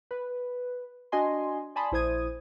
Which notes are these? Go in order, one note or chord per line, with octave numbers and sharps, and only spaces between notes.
B4
D4 F#4 D#5 G#5 C6
D5 G#5 A5 B5 C6 D#6
A#1 E4 C5 D#6 G#6 D#7